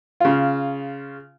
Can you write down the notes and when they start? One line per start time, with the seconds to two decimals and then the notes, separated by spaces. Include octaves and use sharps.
0.20 C#3 F4